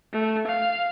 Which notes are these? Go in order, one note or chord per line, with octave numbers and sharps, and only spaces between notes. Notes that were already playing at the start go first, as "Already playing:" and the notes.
A3
F5